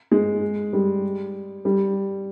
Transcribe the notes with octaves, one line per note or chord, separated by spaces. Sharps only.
G#3
G3
G3